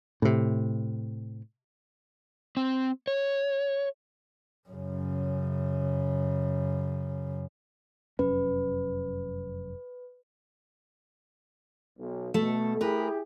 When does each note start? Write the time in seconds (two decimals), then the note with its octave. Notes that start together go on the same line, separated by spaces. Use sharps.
0.22 A2 C3
2.57 C4
3.07 C#5
4.69 F#2 C#3
8.19 F1 F#2 C#4 B4
11.99 B1
12.34 B2 A3 A4
12.81 E4 G4 G#4 A#4 B4